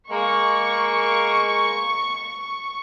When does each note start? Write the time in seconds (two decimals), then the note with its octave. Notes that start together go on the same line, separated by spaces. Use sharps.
0.11 G#3 A#3 C#6